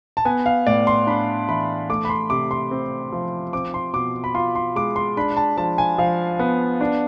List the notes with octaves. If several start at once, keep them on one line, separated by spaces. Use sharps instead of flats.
A5
B3 G#5
F5
A2 D5
C6
D4 B5
E3 B5
A3 D6
B5
C6
C3 D6
C6
C4
F3
C4 D6
C6
B2 D6
B5
F4 C6
C6
G#3 D6
C6
D4 B5
A5
F3 A5
G#5
F3 F5
B3
D4